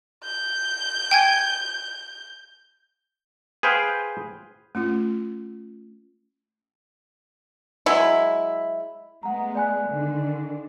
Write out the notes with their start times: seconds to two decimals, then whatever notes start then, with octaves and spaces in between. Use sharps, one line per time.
0.24 G6
1.11 G5 G#5 G#6
3.63 G#4 B4 C5 F5 G5
4.75 A3 C#4 F4
7.86 F#3 G#3 E4
9.23 G#3 A3 B3 F#5 A#5
9.55 D5 G#5 F#6
9.88 D3 D#3 D4